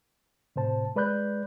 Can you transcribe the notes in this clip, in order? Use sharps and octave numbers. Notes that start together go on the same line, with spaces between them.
A2 C3 C5 A5
G#3 B4 D5 B5 F#6 G6